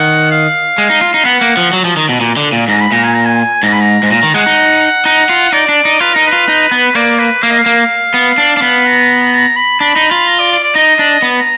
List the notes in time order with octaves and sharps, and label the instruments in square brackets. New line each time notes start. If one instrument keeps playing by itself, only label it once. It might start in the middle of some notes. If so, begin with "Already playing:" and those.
Already playing: [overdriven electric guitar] D#3 [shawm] F#5
[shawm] F5
[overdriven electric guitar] G#3
D#4
F4
D#4
[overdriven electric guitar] B3 [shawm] F#5
[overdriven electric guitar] A#3
F3
F#3
F3
D#3
B2
A#2
D3
A#2
[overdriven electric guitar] G#2 [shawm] A#5
[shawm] B5
[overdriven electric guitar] A#2 [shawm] A#5
[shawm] G#5
A#5
G#5
[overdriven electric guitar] G#2 [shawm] A#5
[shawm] B5
A#5
[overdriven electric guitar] G#2
[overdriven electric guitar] A#2 [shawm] A#5
[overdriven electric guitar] D#3
[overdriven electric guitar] G#3 [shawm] F#5
[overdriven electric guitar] D#4
[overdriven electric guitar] D#4 [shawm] F#5
[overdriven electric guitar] F4
[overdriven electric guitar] D#4 [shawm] D5
[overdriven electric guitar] D4
D#4
[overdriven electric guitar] F4 [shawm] B4
[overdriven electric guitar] D#4 [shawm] A#4
[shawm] B4
[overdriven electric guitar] F4
D#4
B3
[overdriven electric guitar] A#3 [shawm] D5
[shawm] B4
[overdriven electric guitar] A#3 [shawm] F5
[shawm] D#5
F5
[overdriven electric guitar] A#3
B3
D4
D4
B3
[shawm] A#5
A#5
B5
[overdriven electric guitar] D4 [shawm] B5
[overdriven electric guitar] D#4
F4
[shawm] A#5
D5
D5
D5
[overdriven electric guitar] D#4 [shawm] D#5
[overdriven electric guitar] D4
B3
[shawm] A#5